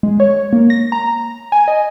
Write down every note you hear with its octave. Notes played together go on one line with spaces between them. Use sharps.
G#3
C#5
A#3
A#6
A#5
G#5
D#5